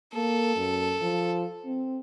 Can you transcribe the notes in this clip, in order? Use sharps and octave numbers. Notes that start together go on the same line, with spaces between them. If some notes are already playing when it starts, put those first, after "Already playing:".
A#3 A4
F#2
F3
C4